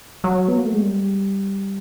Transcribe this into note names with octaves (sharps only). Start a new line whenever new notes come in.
F#3
B3
A#3
A3
G#3
G3